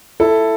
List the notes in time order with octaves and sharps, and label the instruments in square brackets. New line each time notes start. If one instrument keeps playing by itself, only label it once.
[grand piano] E4 A4